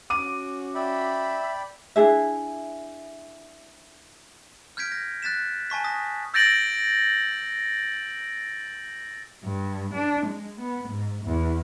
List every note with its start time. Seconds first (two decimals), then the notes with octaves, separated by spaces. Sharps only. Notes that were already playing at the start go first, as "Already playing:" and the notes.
0.10 C#4 F#4 D6 D#7
0.75 D5 E5 G5 B5
1.96 D4 E4 G#4 E5
4.77 F6 G6 G#6 B6 D7
4.92 A#6
5.23 F#6 A6 B6 E7
5.70 G#5 A5 C#6 B6
5.84 D#6 A#6 B6
6.34 E6 G6 A6 A#6 D7 F#7
9.44 G2
9.94 D4
10.26 G#3
10.60 B3
10.88 G#2
11.25 E2